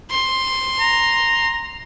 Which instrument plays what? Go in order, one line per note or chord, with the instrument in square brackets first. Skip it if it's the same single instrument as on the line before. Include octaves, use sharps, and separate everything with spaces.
[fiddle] C6
[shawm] A#5